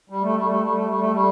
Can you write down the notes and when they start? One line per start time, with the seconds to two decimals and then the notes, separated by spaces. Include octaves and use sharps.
0.10 G3
0.22 A3
0.35 G3
0.48 A3
0.61 G3
0.73 A3
0.87 G3
0.99 A3
1.12 G3